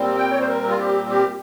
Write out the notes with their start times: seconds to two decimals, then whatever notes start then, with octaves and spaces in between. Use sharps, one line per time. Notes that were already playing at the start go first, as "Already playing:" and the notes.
Already playing: A#2 G3 C4
0.17 G5
0.31 C#5
0.40 C5
0.48 A#4
0.69 F4
0.79 G4
1.10 G4